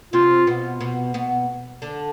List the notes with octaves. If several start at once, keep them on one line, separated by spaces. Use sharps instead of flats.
C3 C4 F4
B2 B3
B2 B3
B2 B3
D3 D4